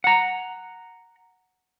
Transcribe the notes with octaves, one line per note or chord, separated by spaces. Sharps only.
F#5 A#5